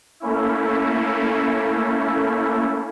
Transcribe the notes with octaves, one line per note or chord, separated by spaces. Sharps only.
A3 A#3 C#4 E4